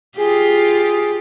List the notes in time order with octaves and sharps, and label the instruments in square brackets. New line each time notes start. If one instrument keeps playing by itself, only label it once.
[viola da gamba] F4 G4 [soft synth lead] G#4